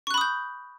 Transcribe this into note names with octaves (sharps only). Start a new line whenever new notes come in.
B5 C#6 D#6 F#6 G6